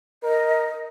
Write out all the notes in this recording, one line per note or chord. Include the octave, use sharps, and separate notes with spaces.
A#4 D#5